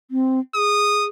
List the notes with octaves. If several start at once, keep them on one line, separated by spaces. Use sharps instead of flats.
C4
G#4 D#6